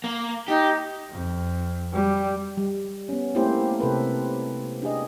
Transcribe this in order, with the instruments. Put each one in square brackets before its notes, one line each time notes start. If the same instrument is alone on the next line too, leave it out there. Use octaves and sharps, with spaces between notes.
[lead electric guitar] A#3
[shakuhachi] D#4 [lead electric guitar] G4
[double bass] F2
G3
[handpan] G3
B3 C#4
A3 A#3 C4 E4 G4 C5
C3 A4 B4
D4 G4 G#4 D#5